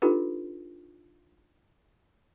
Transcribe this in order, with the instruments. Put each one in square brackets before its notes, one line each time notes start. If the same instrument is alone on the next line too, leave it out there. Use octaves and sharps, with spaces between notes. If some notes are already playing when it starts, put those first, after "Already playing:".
[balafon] D4 D#4 F4 G4 A4 B4